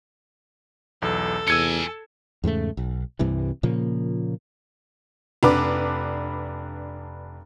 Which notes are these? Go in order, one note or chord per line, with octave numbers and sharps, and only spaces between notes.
B1 E2 A4
E2 F4 G#5 E6 G#6 C#7
E2 G#2 C#3 A3
B1
C2 G2 C3 E3
A#2 C#3 F3 A#3
F1 D4 B4 D6